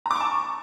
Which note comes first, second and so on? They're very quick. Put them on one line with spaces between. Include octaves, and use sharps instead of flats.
A#5 D6 C#6 A5